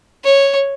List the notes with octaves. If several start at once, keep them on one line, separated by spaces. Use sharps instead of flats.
C#5